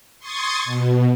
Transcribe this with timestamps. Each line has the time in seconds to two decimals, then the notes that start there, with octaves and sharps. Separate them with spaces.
0.19 C6 C#6 D#6 G#6 A6
0.64 B2